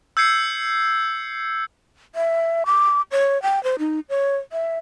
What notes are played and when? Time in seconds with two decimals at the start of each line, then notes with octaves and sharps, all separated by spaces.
0.17 E6 G6 G#6 C7 C#7
2.15 E5
2.66 D6
3.12 C#5
3.42 G5
3.64 C5
3.79 D#4
4.09 C#5
4.52 E5